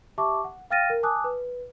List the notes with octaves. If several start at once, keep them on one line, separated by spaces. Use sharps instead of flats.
G4 E5 A5 C#6 D6
F#5
F5 G5 F6 A6 A#6 D#7
A#4
G#5 A5 D6 D#6 F#6
B4